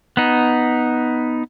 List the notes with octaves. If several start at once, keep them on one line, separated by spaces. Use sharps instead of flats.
B3 D#4